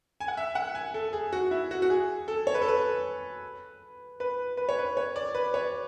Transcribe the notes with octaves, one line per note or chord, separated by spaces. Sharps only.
G#5
F#5
E5
F#5
G#5
A4
G#4
F#4
E4
F#4
F#4
G#4
A4
C#5
B4
A4
B4
B4
B4
C#5
B4
C#5
D5
B4
C#5